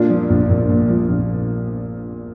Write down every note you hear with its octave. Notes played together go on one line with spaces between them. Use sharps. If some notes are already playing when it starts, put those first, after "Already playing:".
Already playing: A#2 D4 F4
F3
A#1
A#1
A#2
F3
A#1